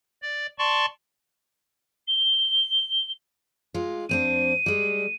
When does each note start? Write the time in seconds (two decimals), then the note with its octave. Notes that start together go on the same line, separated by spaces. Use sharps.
0.22 D5
0.59 D5 A5 C6 C#6
2.07 G7
3.74 G#3 F4
4.09 F2 C4 D4 D#7
4.66 G3 G#3